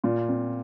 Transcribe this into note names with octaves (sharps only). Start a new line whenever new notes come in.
A#2 F4
C4